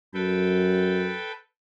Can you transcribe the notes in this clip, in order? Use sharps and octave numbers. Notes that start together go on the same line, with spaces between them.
F#2 A4 B4 G5